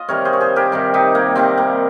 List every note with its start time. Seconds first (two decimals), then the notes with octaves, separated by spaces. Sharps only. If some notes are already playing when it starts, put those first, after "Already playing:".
Already playing: F4 D#5
0.09 C3 D#3 G3 A#4 C#5
0.25 G#4 C5
0.33 C#5
0.41 G#4 C5
0.56 G4 A#4
0.72 C3 D#3 G3
0.94 D#4 G4
1.15 A#3
1.36 C3 D#3 G3 C4
1.58 A#3